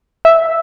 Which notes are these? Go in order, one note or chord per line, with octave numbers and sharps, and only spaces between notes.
E5